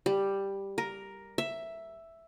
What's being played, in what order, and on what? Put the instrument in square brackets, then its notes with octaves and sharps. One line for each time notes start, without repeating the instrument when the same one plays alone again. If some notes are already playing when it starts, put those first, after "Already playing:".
[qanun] G3
A#4
E5